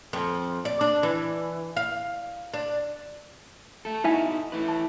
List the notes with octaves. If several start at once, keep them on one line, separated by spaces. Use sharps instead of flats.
F2
D5
D4
E3
F5
D4
A3 A4
D#4 E4 F#4 E5 G#5
A3 E4 B4
A5